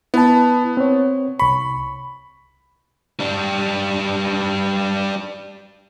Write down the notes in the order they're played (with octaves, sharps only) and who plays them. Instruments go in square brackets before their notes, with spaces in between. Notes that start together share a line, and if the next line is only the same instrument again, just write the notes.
[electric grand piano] B3 [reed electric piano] E4 B4 A5
[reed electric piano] C4 C#5
[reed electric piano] C2 C#6 [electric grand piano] B5
[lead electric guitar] G3 D4